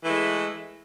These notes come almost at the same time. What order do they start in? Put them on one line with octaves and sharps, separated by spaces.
E3 A3 G#3